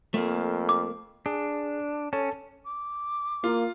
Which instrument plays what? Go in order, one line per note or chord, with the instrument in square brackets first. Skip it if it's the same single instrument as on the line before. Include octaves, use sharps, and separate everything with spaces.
[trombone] F2 [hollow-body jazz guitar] A3 A#3
[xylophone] D6
[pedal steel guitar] D4 [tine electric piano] G#4
[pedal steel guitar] C#4 [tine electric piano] A4 C#5 A5
[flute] D6
[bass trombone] A#3 [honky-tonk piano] F4